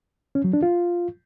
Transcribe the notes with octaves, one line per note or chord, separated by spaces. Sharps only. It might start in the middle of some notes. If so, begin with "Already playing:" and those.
C#4
F#3
D4
F4